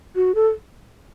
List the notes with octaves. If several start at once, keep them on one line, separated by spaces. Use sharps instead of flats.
F#4
A4